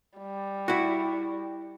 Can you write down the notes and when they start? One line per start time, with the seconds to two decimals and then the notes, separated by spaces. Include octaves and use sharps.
0.18 G3
0.68 E4 F#4